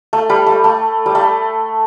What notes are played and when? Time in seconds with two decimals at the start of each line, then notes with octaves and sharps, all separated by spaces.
0.13 A3
0.29 G3
0.47 A3
0.64 A3
1.06 G3
1.15 A3